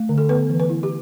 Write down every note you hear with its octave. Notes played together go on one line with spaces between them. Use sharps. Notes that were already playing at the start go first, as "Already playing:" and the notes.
Already playing: A3
D3
A4
B3 B4
E3
B4
E4
G4